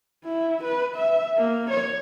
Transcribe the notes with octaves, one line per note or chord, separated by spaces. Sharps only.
E4
B4
E5
A#3
C#5